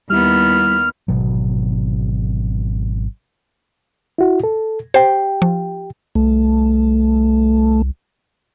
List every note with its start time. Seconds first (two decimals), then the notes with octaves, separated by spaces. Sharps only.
0.10 D#2 G3 B3 E4 F6
1.08 G#1 B2 F#3
4.18 E4 F#4
4.44 A4
4.94 G4 C5 G5
5.42 F3
6.15 C2 A3